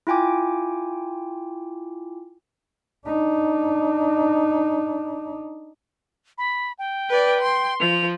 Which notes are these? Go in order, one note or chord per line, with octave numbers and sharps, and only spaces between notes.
E4 F4 G5 G#5 D6
D4 D#4
B5
G5
B4 D5
C6
F3 F7